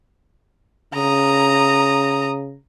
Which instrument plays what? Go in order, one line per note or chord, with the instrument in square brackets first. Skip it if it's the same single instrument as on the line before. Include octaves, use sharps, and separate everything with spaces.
[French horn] C#3 [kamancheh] A#5 D#6